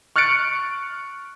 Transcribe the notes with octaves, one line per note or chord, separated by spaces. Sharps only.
C#6 F6 F#6 A6 C#7 D7